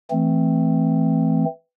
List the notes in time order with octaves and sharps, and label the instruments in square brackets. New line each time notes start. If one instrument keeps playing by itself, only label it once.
[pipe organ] E3 A3 C4